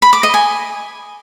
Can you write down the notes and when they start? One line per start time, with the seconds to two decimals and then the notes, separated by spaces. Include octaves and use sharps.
0.02 B5
0.13 D6
0.23 D#5
0.34 G#5